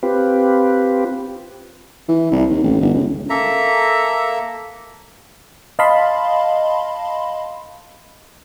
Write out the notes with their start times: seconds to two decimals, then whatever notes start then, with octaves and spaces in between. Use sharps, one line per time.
0.03 C4 F4 G4 B4
2.08 E3
2.31 C2
2.50 D#2
2.63 A1
2.81 G1
2.93 C#2
3.30 A#3 A4 E5 A#5
5.79 D#5 F5 A5 B5 C6